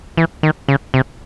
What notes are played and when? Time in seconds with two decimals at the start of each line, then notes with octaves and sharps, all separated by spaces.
0.17 E3
0.43 D#3
0.68 C#3
0.94 C3